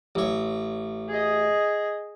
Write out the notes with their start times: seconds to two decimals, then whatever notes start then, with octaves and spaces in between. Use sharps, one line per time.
0.15 A1 C#5
1.08 G#4 D#5